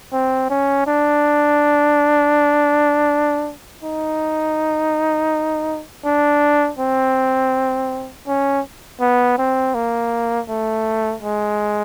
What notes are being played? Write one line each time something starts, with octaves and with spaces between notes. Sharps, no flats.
C4
C#4
D4
D#4
D4
C4
C#4
B3
C4
A#3
A3
G#3